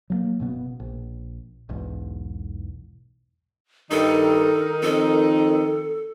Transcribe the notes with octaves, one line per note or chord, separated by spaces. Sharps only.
F#3 G#3 A#3
F#1 B2 B3
A#1
E1 B1 E2 G#2
G2 D#3 D#4 A4 A#4
F2 A4